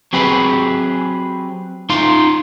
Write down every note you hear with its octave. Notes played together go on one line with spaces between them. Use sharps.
F#3 C4 G4 G#4 B4
D#4 F4 F5 C6